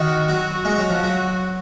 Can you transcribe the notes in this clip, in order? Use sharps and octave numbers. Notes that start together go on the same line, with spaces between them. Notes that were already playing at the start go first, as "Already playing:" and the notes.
Already playing: D#3 F#4
F#3
G#3 F#4
F#3
F3
F#3